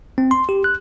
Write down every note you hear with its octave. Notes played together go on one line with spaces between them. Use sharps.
C4
C6
G4
F#6